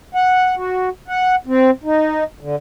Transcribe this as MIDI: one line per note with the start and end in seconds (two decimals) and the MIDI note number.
0.15 0.55 78
0.57 0.89 66
1.08 1.35 78
1.47 1.71 60
1.84 2.24 63
2.41 2.56 50